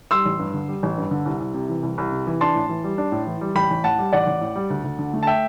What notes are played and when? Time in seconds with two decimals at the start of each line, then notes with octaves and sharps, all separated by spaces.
0.11 G3 C6 E6
0.25 A1
0.39 G2
0.54 D3
0.68 G3
0.83 A1
0.98 G2
1.11 D3
1.26 C2
1.40 C2
1.54 C3
1.69 E3
1.83 C2
1.98 C2
2.12 C3
2.27 E3
2.41 D4 A5 C6
2.55 A2
2.69 E3
2.84 G3
2.98 D4
3.12 A2
3.27 E3
3.41 G3
3.55 A1 G5 B5
3.70 A1
3.84 A2 F#5 A5
3.99 G3
4.13 A1 D5 F#5
4.27 A1
4.41 A2
4.56 G3
4.70 D2
4.84 D2
4.99 D3
5.14 A3
5.23 A5
5.27 E5 G5